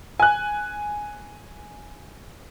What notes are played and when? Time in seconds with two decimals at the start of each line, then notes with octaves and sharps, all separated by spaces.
0.20 G#5 F#6